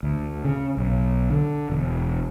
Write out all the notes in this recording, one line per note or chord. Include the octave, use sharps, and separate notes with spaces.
D2
C#3
B1
D3
E1